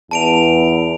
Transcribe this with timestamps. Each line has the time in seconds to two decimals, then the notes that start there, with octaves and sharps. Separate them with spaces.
0.11 E2 A5 D7 F7